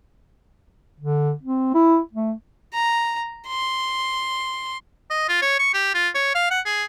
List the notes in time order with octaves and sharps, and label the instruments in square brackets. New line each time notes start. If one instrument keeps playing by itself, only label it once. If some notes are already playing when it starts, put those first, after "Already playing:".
[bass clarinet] D3
C4
E4
A3
[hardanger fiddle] A#5
C6
[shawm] D#5
F4
C#5
C#6
G4
F4
C#5
F5
F#5
G#4